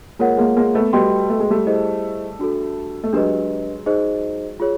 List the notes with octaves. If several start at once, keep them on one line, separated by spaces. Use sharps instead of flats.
G#3 A#3 F4 A#4 C#5 F#5
G#3 A#3
G#3 A#3
A3 B3
G3 A3 F#4 B4 D#5 G5 C6
A3
G#3
G3 A3
E4 G#4 C5 D#5
D4 F#4 A4
A3
F#3 G#3 D4 G4 B4 D#5
D#4 G#4 C5 D#5
F4 G#4 C#5